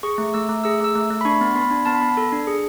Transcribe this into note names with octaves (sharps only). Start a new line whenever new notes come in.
G#4 C#6
A3
A3 E6
A3
G#4 E6
A3 E6
A3
A3
B5
D4 C#6
B3
B3 B5
D4
B3 A5
B5
B3 A5
A4
D4
G#4